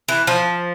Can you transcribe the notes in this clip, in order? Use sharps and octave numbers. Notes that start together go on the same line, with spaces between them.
E3
F3